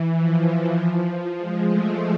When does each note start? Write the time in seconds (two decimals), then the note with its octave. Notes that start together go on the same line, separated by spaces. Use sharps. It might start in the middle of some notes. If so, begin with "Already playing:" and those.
Already playing: E3
0.17 F3
1.38 G#3
1.68 A3